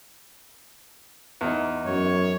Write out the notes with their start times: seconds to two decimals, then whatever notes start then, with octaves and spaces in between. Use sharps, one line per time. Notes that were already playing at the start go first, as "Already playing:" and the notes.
1.41 E2 D#4
1.86 F#2 C#5